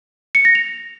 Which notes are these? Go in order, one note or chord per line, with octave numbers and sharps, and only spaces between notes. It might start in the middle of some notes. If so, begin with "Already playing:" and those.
C#7
A#6
F7